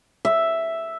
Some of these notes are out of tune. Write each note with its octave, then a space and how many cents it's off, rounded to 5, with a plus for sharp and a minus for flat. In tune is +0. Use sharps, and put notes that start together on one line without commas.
E5 +0